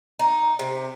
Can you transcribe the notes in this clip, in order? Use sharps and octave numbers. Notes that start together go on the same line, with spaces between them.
D#4
C3